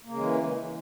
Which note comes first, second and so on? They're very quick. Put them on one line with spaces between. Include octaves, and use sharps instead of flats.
A#3 C#3 G#3 E3